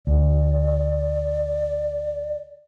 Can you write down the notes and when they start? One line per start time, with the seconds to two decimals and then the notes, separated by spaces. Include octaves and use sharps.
0.07 D2 D5